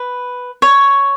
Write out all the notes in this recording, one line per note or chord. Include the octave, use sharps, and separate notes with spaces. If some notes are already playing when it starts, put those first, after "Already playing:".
Already playing: B4
C#5